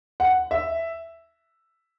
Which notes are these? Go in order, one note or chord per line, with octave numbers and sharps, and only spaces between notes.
F#5
E5